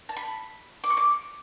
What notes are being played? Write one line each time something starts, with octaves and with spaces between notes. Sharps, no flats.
A5
B5
D6
C#6
D6